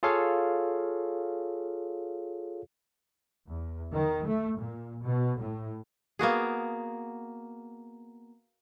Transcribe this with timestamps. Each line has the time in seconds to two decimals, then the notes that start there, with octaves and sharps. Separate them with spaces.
0.03 F4 G#4 A4 C#5 F5
3.50 E2
3.92 D#3
4.27 A3
4.58 A#2
5.02 B2
5.39 A2
6.19 A#3 B3 F#4 G#4